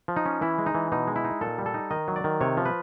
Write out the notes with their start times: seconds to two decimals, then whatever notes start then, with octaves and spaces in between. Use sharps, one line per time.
0.08 F3
0.16 D#4
0.26 C#4
0.41 E3 E4
0.59 G#3
0.66 D#4
0.75 E3
0.92 B2 D#4
1.07 G#3
1.16 E4
1.25 D#4
1.41 A#2 A4
1.58 G3
1.66 A4
1.74 D#4
1.91 D#3 D#5
2.08 F#3
2.16 D5
2.24 D#3
2.41 C3 C#5
2.57 F3
2.65 B4